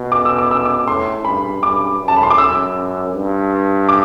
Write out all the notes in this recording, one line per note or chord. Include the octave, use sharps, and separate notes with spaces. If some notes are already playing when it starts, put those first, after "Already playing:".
Already playing: B2
D6
E6
D6
E6
D6
A2 C6
G2 B5
G2 D6
F#2
A5
B5
C6
D6
F#2 E6
G2
D6